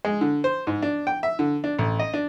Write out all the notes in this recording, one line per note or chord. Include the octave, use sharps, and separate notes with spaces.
G#3
D3
C5
G#2
D4
G5
E5
D3
D4
A1
D#5
D4